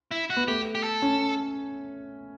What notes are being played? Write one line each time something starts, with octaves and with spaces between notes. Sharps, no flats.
E4
F#4
B3
A3 G4
G4
A4
C#4